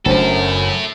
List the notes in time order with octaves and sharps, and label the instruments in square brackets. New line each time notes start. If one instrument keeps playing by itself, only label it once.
[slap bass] F#1 F#3 [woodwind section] F#2 [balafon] A3 D4 C5 [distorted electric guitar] E4 A4